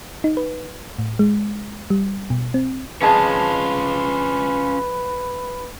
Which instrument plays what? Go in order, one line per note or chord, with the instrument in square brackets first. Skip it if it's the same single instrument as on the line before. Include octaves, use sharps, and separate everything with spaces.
[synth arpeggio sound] D#4
B4
A2
G#3
G3
B2
C4
[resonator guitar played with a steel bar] F2 G#3 A5 [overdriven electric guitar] C#4 F4 [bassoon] B4